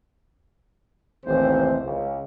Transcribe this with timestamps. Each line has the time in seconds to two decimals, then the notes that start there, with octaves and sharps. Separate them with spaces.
1.26 A1 D#2 C3 C5
1.84 C#2